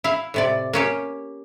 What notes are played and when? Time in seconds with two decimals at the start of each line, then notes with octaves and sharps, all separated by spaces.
0.04 E4 F5
0.34 A2 C3 D5
0.73 A#3 C#4 G4